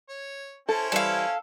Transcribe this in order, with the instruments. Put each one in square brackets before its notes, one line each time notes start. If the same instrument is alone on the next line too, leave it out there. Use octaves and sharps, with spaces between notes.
[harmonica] C#5
[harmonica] C#4 E4 C5 [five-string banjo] A4
[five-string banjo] E3 G3 [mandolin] A4 F5